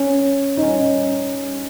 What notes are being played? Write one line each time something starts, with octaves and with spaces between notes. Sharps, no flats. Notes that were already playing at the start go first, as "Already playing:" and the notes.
Already playing: C#4
D#4
C#4